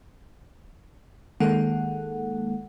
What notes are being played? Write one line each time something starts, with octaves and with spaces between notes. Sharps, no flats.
D#3 G#3 A#3 A4 F#5